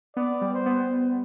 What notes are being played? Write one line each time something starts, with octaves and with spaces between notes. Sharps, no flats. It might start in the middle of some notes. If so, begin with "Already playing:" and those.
B3 D5
G3
C5
B3